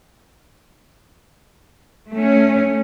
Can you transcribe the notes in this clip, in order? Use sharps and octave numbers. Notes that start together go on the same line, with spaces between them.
A3 C#4